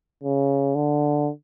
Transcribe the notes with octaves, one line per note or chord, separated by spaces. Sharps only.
C#3
D3